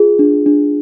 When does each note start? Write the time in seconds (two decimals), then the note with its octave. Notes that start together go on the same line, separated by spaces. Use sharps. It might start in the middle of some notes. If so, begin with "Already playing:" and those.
Already playing: F4 G#4
0.19 D4
0.46 D4